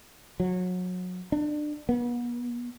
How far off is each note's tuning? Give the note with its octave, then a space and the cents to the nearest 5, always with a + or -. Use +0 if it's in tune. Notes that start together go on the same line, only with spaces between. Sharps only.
F#3 -30
D4 +25
B3 -40